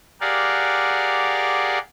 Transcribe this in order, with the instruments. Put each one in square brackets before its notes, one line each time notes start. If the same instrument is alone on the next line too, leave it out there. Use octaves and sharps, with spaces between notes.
[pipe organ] G4 G#4 A#4 D5 F5 F#5